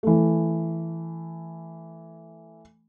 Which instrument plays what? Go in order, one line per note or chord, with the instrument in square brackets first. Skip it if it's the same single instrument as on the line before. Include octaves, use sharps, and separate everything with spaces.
[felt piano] E3 A3